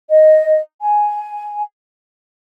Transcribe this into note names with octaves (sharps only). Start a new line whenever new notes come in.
D#5
G#5